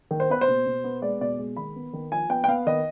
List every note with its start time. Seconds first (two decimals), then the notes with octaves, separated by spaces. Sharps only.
0.11 D#3
0.20 C5
0.30 B3 B4
0.41 C5
0.48 B2
0.66 B2
0.84 B3
1.02 G#3 D5
1.21 B2 D5
1.38 G#3
1.56 D#3 B5
1.76 B3
1.93 D#3
2.12 F3 G#5
2.29 B3 G5
2.44 G5
2.48 B3 F5
2.66 D#3 D#5